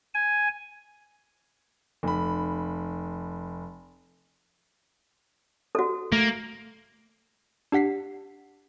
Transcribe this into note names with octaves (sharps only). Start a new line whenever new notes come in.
G#5
F1 B5
F#4 A4
A3 A#3
D4 G4 F#5 B6 C7